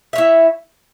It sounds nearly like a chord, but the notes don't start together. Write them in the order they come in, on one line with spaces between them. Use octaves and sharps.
E5 C#5 E4